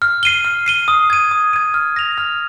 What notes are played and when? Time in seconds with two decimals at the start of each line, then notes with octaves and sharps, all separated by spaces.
0.02 F6
0.23 C7 D#7 G7
0.45 F6
0.66 C7 D#7 G7
0.88 D#6
1.10 G#6 D#7
1.31 D#6
1.53 G#6 D#7
1.74 F6
1.96 A#6 F7
2.18 F6